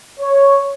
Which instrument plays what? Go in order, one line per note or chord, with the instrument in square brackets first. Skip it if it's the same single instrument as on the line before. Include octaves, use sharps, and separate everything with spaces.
[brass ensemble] C#5